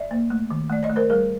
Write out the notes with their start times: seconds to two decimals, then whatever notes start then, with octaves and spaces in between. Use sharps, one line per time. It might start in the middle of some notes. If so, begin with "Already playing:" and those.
Already playing: D5 E5
0.11 A#3
0.30 A3
0.51 D#3
0.69 A3 D5
0.83 C#5 D#5
0.89 A3
0.96 A#4 C5
1.10 G3 G#4 A#4